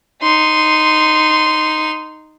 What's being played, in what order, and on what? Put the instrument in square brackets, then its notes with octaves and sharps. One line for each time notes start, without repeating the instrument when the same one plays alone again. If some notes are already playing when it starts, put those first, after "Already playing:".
[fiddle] D#4 C6